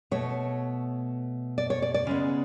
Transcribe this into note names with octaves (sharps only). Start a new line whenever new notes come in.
B2 A3 C#5
D5
C#5
D5
D5
C#3 G#3 B3